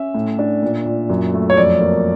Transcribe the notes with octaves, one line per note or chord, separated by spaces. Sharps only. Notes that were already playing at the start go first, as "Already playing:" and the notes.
Already playing: C#4 E5
A2
D4
A#2
A#2
F#2
A3
C#5
F2 D5
A#3